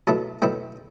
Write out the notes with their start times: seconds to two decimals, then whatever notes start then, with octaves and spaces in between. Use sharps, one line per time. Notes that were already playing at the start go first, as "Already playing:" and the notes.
0.07 B2 F#3 A3 E4 A5
0.42 B2 F#3 A3 E4 G5